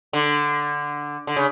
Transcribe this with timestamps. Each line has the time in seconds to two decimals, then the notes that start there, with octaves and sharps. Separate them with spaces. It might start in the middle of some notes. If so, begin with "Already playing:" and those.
0.13 D3
1.27 D3
1.36 C#3